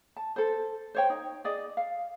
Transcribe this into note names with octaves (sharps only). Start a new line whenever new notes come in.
A5
A4 C5
C5 C#5 G5
D#4
G#4 D5 D#5
F5